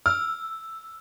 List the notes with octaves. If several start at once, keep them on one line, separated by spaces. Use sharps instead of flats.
E6 F6